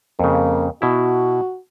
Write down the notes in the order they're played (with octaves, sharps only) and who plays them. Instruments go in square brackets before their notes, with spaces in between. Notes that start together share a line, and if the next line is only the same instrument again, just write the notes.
[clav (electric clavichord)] F2 C#3 [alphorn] A#3
[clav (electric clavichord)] B2 E4 [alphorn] F#4